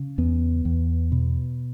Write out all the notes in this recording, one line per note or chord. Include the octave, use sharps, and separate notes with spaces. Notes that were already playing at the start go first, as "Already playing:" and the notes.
Already playing: C#3
E2 B3
E2
B2